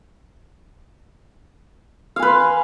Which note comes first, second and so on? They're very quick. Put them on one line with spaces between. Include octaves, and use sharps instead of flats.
F5 G#5 B4 C6